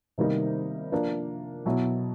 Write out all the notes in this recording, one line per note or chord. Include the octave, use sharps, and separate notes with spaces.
C3 D#3 G3 A#3 D#4
F3 A#3 D4
B2 F#3 B3 E4